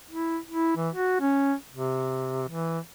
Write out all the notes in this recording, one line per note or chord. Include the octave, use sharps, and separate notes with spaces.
E4
E4
E3
F#4
C#4
C3
E3